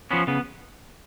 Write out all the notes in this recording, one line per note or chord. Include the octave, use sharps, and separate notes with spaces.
F3 B3 C#4
C#3 B3